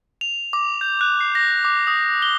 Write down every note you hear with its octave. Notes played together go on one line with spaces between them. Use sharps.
F7
D6
G6
F#6
C7
A#6
D6
D#6
G7